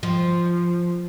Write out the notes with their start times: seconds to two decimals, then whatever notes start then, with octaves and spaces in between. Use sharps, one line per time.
0.03 F3